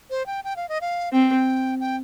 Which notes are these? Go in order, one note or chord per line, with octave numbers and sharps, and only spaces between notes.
C5
G5
G5
F5
D#5
F5
C4 G5
G5